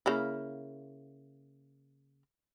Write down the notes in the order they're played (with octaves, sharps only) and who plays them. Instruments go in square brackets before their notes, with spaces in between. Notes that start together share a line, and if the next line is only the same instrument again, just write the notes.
[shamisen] C#3 A#3 E4